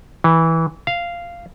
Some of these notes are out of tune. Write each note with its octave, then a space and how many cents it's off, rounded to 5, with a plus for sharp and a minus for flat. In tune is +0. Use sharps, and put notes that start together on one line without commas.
E3 -15
F5 -10